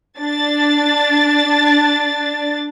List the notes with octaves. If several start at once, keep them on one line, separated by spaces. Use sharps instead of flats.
D4 A6